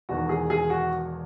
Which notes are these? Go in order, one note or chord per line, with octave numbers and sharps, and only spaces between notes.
E1 E2 D#3 F#4
G#4
G#4
F#4